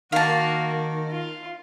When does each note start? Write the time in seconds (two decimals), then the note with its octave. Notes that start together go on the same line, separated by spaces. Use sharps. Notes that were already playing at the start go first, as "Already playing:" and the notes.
0.12 D#3 A#3 F#4 F5 A5
1.10 F4